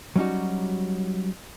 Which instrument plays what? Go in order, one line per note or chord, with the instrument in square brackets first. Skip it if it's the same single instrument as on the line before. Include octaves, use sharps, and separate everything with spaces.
[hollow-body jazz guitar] F#3 G3 C#4 D#4 F#4